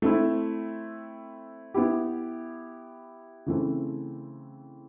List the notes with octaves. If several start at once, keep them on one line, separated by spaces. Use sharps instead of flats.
A3 C4 E4
B3 E4 G4
C#3 E3 A3 C4